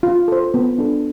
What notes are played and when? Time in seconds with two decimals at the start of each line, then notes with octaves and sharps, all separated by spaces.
0.03 F4
0.28 A4 C5
0.54 B3
0.78 D4 A4